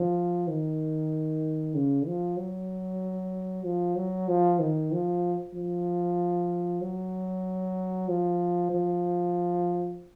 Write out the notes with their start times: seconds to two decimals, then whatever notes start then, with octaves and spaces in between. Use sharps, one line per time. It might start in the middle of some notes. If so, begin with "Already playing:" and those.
Already playing: F3
0.48 D#3
1.75 C#3
2.06 F3
2.37 F#3
3.64 F3
3.96 F#3
4.28 F3
4.60 D#3
4.92 F3
5.55 F3
6.81 F#3
8.08 F3
8.71 F3